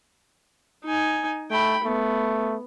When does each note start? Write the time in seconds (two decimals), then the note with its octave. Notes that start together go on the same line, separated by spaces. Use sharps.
0.85 D#4 G#5
1.51 A3 G5 B5
1.84 A3 B3